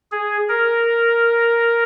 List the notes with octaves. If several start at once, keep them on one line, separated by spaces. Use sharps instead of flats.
G#4
A#4